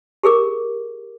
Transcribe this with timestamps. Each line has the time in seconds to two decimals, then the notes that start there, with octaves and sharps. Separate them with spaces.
0.23 G4 G#4 A#4 D6